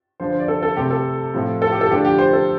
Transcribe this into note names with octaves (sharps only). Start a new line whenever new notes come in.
D3 F3 D4 C5
C5
D5
A4
A4
C3 A3 C4 G4
A4
A2 F3 C4
A4
G4
A4
D3 F3 A3 D4 G4
G4
C5
A4